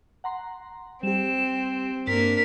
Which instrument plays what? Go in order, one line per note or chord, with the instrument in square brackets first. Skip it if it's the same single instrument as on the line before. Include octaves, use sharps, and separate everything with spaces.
[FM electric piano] F#5 A#5 C6
[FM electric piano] G3 G4 [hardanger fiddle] C4 [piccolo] E7
[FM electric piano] G2 [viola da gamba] A#3 D4 A#4 [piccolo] B6